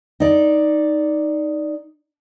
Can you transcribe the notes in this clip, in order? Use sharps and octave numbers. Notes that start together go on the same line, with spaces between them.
D#4 D5